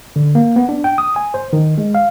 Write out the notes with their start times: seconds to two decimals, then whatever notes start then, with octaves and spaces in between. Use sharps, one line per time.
0.16 D3
0.35 A#3
0.56 B3
0.69 D4
0.84 G5
0.98 D#6
1.16 G#5
1.34 C5
1.53 D#3
1.78 G#3
1.95 F5